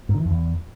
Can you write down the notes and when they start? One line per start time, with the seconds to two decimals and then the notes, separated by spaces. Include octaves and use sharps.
0.09 G#2
0.15 D3
0.20 E3
0.25 F2
0.31 E2